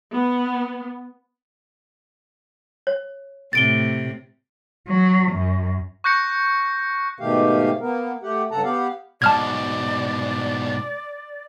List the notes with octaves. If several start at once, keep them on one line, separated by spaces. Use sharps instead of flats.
B3
C#5
A2 C3 A6 D7 G7
F#3
F#2
C#6 F#6 G6 A#6 C#7
G#2 B2 D#3 A3 G4 F5
A#3 B3 A#4
A3 G4 F#5
G2 C#3 A4 F#5 A5 A#5
B3 G4 F5 F#5
G#2 B2 D5 A5 F6 G#6